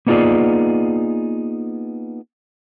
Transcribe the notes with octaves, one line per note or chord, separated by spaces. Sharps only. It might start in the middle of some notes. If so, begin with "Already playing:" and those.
A#3 B3 D#4 F4 G#4 D5